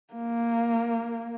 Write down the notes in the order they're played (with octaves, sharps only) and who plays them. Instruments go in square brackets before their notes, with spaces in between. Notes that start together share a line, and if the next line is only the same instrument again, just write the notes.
[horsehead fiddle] A#3